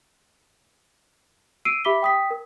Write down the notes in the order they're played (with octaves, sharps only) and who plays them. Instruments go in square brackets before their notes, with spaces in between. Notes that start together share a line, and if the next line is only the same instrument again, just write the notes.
[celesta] E6 C7 D7 D#7
G4 E5 B5 D6 B6 G7
G5 D#6 B6
A#4